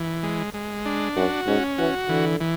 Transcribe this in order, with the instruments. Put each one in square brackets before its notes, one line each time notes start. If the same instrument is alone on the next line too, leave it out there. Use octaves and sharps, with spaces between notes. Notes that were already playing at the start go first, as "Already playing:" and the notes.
Already playing: [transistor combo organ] E3
G#3
G#3
D4
[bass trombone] F#2 [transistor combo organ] F#4
[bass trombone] G#2 [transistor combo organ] C#4
[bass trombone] E3 [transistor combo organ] F#4
[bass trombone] D3 [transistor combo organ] E3
[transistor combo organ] E3